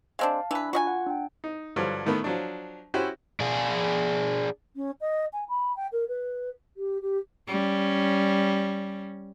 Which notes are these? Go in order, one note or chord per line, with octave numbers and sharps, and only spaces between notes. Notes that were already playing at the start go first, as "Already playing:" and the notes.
G#3 C4 D4 F5 A5
E3 D4 B4 B5
F4 F#4 D#5 G#5
F#5
D4 G5
D#4
G2 D3 F3 F#3
A2 D#3 A3 B3
F3 F#3 D4
C#4 E4 F#4 G4 C5 E5
D4 G#4
C#4
D#5
G#5
B5
G5
A#4
B4
G4
G4
G3 C#4